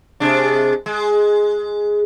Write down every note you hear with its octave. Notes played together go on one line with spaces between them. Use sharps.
C3 G#3 D4
G#3